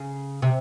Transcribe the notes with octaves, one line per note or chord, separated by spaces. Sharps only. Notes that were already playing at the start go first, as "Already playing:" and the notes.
Already playing: C#3
C3